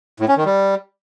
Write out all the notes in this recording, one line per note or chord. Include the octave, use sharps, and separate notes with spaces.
A2
C#4
D#3
G3